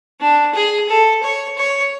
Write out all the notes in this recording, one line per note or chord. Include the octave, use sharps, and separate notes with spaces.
D4
G#4
A4
C#5
C#5